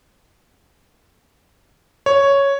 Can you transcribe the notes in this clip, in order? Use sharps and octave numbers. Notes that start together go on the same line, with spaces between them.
C#5